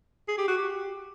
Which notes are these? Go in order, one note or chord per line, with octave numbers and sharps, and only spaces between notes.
G#4
G4
F#4
G4